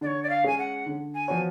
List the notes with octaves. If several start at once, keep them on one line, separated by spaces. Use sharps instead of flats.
D3 D5
C#5
D5
F5
G#3 C#4 G#4 G#5
F#5
D3
G#5
F3 B3 F#4 C#5